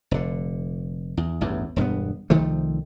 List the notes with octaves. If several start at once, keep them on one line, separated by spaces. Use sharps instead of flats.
F1 D3
E2
A1 E2 G2
E1 G2 G#3 B3
C2 D#3 F3 A3